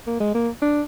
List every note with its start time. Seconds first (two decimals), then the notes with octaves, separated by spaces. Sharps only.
0.07 A#3
0.20 G#3
0.34 A#3
0.62 D4